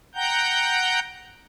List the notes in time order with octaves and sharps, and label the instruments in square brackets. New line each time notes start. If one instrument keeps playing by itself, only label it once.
[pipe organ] F#5 G5 A#5 G6